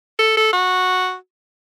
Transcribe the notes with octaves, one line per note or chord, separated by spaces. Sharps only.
A4
A4
F#4